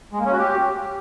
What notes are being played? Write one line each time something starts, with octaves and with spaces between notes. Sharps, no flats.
G#3
A#3
C#4
F#4
G4